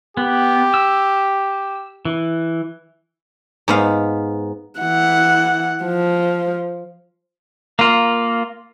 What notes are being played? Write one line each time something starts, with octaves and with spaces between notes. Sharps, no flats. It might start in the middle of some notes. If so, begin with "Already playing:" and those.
B3 G4
E6
E3
G#2 B3 F5
E3 F#5
F3
A#3 F4